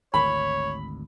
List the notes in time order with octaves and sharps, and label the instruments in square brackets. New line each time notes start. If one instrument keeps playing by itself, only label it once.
[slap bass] G#1 D2 [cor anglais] C#5 [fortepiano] B5